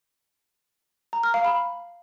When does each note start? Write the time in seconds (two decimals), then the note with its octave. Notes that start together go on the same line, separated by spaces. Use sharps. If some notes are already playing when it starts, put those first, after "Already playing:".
1.13 A#5
1.23 F6
1.34 F5
1.45 B5